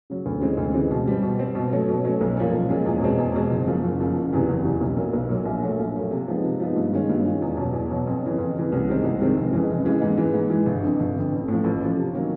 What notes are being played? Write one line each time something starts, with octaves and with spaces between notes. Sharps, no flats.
C#3 F#3
D2
C#3 E3 G#3 C4
D2
C#3 E3 G#3 C4
B2
G3 C4
B2
G3 C4
B2
F#3 A3 C#4
B2
F#3 A3 C#4
B1
A#2 F3 G#3 C#4
B1
A#2 F3 G#3 C#4
E2
B2 G#3 C4
E2
B2 G#3 C4
F#1
F#2 C#3 F3
F#1
F#2 C#3 F3
F#1
E2 C3 E3
F#1
E2 C3 E3
B1
A#2 F#3
B1
A#2 F#3
A#1
A#2 F#3 A3
A#1
A#2 F#3 A3
C3
F3 G#3 B3 D#4
C3
F3 G#3 B3 D#4
G2
D#3 G#3 C#4 F4
G2
D#3 G#3 C#4 F4
E2
B2 F#3
E2
B2 F#3
F2
C#3 E3
F2
C#3 E3
C2
C3 D#3 G#3 C4
C2
C3 D#3 G#3 C4
F1
F2 C#3 E3 G#3
F1
F2 C#3 E3 G#3
G#2
E3 G#3
G#2
E3 G#3
G1
F2 D3
G1
F2 D3
A1
A2 F3
A1
A2 F3
C3
D#3 F#3 A#3 C#4